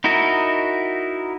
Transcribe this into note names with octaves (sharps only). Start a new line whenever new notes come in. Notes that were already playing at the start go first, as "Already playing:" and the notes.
D#4 E4 F#4 A#4 D#5